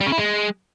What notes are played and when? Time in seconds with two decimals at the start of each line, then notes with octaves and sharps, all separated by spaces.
0.01 G3
0.06 C#3
0.12 E4
0.18 G#3